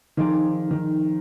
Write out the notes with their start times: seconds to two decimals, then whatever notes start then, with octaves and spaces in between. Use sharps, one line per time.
0.17 D#3 F3 C4 D#4 G#4 D5
0.71 D#3